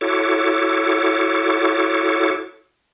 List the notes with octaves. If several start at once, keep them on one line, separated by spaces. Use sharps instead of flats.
E4 F#4 A4 C#5 D6